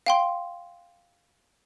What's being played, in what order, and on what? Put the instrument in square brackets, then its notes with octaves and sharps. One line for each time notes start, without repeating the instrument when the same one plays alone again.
[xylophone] F5 G5 C6